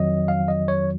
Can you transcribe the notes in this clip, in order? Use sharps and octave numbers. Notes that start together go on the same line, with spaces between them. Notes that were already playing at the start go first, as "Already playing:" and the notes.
Already playing: F2 D#3 F#3 D#5
F5
D#5
C#5